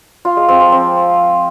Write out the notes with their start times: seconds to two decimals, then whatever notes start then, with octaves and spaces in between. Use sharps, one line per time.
0.25 F4
0.37 G#3
0.48 C4
0.60 F3
0.72 C4